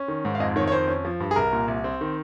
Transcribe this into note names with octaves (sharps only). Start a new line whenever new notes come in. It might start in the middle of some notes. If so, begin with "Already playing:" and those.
Already playing: C#4
D#3
G#2
F5
F2 D#5
D#3 C#5
C#5
F2 C5
C#4
F3
G2
G#4
C2 A#4
A#2
C2
C4
D#3